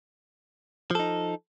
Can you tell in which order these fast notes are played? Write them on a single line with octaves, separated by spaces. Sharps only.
F3 A4 D#4